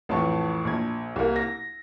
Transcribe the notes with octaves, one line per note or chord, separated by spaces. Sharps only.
A1 F2 G5 A5 C#6
A#1 G#6
C2 A#3
A#6